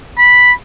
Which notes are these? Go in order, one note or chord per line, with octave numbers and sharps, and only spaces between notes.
B5